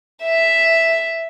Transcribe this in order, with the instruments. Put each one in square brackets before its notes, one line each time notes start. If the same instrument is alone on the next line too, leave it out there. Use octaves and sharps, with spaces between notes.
[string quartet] E5